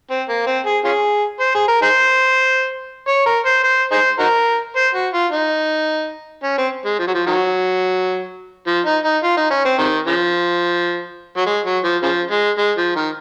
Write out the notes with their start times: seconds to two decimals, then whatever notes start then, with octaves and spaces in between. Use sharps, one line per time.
0.10 C4
0.28 A#3
0.46 C4
0.66 G#4
0.84 C#4 F4 G#4
1.40 C5
1.55 G#4
1.68 A#4
1.82 D#4 G#4 C5
3.08 C#5
3.26 A#4
3.45 C5
3.63 C5
3.91 D#4 G#4 C5
4.19 D#4 F#4 A#4
4.76 C5
4.95 F#4
5.13 F4
5.32 D#4
6.43 C#4
6.58 C4
6.85 G#3
6.99 F3
7.07 F#3
7.14 F3
7.27 D#3 F#3
8.67 F3
8.85 D#4
9.04 D#4
9.23 F4
9.37 D#4
9.51 C#4
9.65 C4
9.79 C3 D#3
10.07 C#3 F3
11.37 F#3
11.47 G#3
11.65 F#3
11.84 F3
12.03 C#3 F3
12.30 G#3
12.58 G#3
12.78 F3
12.96 D#3